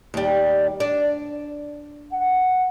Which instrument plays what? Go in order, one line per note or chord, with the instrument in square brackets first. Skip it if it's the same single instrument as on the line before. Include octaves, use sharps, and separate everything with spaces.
[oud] D#2 G3
D4
[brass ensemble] F#5